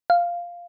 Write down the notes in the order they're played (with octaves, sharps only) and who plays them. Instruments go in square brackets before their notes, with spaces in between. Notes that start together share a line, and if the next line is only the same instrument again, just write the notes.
[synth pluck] F5